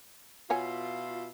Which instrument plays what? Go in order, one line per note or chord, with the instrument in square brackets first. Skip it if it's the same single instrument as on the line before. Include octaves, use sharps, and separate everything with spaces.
[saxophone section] B2 E4 F4 [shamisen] C#5 F#5 G#5